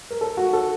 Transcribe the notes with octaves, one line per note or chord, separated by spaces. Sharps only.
A#4
A4
F#4
A4